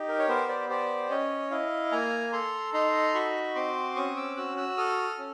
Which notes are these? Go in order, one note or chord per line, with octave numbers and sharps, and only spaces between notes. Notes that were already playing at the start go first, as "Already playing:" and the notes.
Already playing: D#4 G4
A#4
C#5
B3 A#4 C5
C5 D5
G4 C5 D5
C#4 C#5 D#5
E4 D#5 F5
A#3 G#5 A#5
A4 A#5 C6
D#4 A#5 C6
F#4 B5 C#6
C4 C6 D6
C#4 C#6 D#6
D6 E6
F#4 E6 F#6
E6 F#6
A4 D#6 F6
C#4